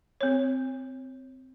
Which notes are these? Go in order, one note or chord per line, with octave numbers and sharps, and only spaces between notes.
C4 C#5